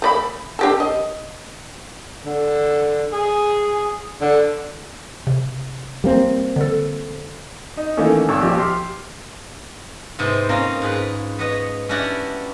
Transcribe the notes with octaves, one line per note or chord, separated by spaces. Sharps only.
A3 D5 B5
D4 G4 A4
D#5
D3
G#4
D3
C3
G3 A#3 C4
D3 A4
D#4
D#3 E3 A3 A#3 C#4 A4
G#1 C#6 E6
A#1 F3 G4
G4 C6 F6
G#2 C3 B3 C4
A#3 C4 C#4 F4 A#4 D#5
G#2 G#4 B4
B3 B4 C#5 D#5
C#4 D4 E4 F#4 G4 D5